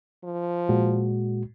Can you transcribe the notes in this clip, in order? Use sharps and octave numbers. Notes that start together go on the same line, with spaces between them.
F3
A#2 G#3 F#4